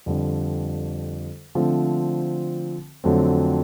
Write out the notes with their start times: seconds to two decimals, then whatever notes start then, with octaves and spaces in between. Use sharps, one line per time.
0.06 F2 D3 G3
1.55 D3 F3 A3 C4
3.04 F2 D3 F#3 A3 C4